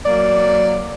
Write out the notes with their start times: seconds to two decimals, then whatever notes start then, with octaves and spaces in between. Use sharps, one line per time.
0.05 F#3 A#3 D5